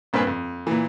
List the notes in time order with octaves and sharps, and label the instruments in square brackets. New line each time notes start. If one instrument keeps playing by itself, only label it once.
[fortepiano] A#1 G2 A#3 C4 B4 G#5
F2
A#2 E3